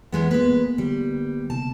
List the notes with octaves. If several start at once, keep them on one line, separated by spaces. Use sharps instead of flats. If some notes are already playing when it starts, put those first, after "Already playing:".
E2 G#3 B3
G#3 A#3 B3 B4
D3 G3
C3 A5